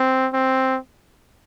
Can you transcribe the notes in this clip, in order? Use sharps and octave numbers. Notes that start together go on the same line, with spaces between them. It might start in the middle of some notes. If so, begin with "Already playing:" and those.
Already playing: C4
C4